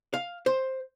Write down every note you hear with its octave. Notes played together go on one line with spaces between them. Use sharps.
F5
C5